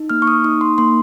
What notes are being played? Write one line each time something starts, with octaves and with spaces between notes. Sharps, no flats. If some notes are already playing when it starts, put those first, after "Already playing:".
Already playing: D#4
A#3 F6
C#6
D#6
D#4 D#6
C6
A#3 C6